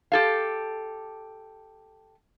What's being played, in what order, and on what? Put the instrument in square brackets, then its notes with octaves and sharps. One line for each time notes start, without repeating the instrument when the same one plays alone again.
[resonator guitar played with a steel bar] G4 A4 F5